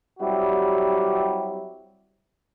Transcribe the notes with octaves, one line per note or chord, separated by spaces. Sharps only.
F#3 G3 C4 E4 F#4 G4